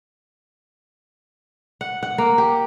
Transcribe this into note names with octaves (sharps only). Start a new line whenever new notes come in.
F#5
F#5
A#3
G4